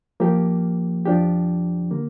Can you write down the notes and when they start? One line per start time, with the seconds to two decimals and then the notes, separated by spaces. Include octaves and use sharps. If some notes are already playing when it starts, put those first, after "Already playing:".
0.20 F3 A#3 G4
1.06 F2 F3 D4 G4
1.91 D3 A#3